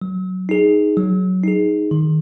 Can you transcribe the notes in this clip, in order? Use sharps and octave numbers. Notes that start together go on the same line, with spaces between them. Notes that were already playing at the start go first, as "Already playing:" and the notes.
F#3
D#4 G#4
F#3
D#4 G#4
D#3